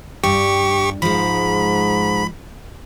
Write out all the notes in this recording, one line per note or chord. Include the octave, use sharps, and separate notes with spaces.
G2 G4 C#6
G#2 F3 G#3 B5